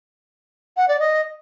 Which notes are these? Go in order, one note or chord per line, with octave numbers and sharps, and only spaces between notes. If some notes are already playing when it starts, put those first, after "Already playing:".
F#5
D5
D#5